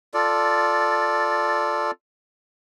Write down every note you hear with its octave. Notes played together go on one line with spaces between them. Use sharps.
F4 A4 D5